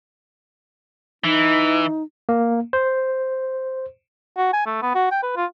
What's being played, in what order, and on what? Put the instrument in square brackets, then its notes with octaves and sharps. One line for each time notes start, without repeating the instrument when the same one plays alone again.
[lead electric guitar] E3 [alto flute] D#4
[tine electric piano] A#3
C5
[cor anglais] F#4
G#5
A3
B3
F#4
G5
B4
F4